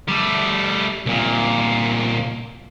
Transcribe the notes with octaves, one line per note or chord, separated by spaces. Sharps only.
G3 A3
C2 A#2